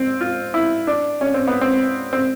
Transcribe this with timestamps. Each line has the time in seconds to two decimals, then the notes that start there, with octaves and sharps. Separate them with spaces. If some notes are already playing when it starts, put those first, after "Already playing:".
Already playing: C4
0.21 F4
0.54 E4
0.87 D4
1.21 C#4
1.34 C4
1.48 B3
1.61 C4
2.13 C4